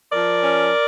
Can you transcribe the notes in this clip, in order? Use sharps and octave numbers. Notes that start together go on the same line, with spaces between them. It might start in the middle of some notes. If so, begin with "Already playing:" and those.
F3 A#4 D5
C#4